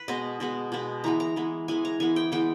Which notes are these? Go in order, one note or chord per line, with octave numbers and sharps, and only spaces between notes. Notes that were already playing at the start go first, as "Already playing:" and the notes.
Already playing: B4
B2 G#3 B3 D#5
B2 G#3 B3
B2 G#3 B3
E3 G#3 B3 A#5
A#5
E3 G#3 B3
E3 G#3 B3 G#5
A#5
E3 G#3 B3 G#5
G5
E3 G#3 B3 G5